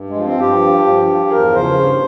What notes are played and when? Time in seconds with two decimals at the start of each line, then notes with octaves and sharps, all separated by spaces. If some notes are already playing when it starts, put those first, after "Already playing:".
Already playing: G2
0.10 G#3
0.17 F3
0.24 C4
0.40 G2 G4
0.62 F3
0.85 G2
1.09 F3
1.28 G#4
1.31 E2 A#4
1.55 C#3 C5
1.78 G2